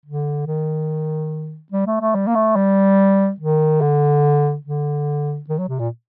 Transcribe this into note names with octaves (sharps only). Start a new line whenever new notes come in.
D3
D#3
G3
A3
A3
G3
A#3
A3
G3
D#3
D3
D3
D#3
F#3
C3
A#2